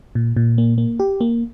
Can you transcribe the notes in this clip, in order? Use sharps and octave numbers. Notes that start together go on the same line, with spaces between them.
A#2
A#2
A#3
A#3
G4
A#3